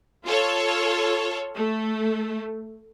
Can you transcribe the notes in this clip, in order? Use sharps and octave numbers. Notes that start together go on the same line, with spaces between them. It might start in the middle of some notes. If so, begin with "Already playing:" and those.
F4 A4 C#5
A3